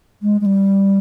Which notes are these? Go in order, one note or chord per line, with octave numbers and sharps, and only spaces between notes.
G#3
G#3
G3